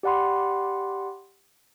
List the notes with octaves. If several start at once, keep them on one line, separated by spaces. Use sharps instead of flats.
G4 D5 F#5 B5 C6